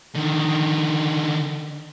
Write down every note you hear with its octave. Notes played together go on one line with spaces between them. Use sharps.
D3 D#3